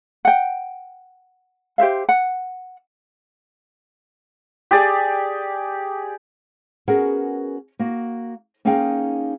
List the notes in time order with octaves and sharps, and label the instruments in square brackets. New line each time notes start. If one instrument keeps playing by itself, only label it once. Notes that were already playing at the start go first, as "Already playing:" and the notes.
[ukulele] F#5 G5
G4 C5 E5 F5
F#5
[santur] G4 G#4 D5
[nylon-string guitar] B3 C#4 F#4 G#4 A#4 F#5
A#3 F#4
A#3 C#4 D#4 G#4 F5 G5